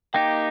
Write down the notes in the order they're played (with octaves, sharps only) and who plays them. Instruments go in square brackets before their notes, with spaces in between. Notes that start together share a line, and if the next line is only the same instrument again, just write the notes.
[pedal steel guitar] A#3 D#4 G4 [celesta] G5